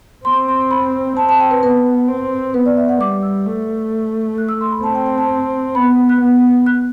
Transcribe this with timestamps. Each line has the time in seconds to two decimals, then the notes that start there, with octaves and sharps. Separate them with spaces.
0.25 C4 C6
0.48 C6
0.71 B5
1.17 C4 A5
1.29 A5
1.40 G5
1.51 B4
1.62 B3 B4
2.08 C4
2.54 B3 B4
2.66 D5
2.77 E5
2.89 F#5
3.00 G3 D6
3.23 E6
3.46 A3
4.38 F#6
4.49 E6
4.61 C6
4.71 B5
4.83 C4 A5
4.95 G5
5.06 G5
5.18 A5
5.75 B3 B5
6.09 F#6
6.21 B3
6.66 F#6